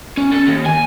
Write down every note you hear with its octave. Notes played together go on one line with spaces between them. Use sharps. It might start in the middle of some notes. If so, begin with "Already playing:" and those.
C#4
A4
D#2
G#5